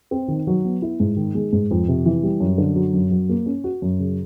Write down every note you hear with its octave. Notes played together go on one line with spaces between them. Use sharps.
C4
D#3
F#3
B3
E4
G#2
D#3
G#3
G#2
F2
C3
E3
G3
F#2
D3
F#3
F#2
F#3
A#3
C#4
F#4
F#2
C#3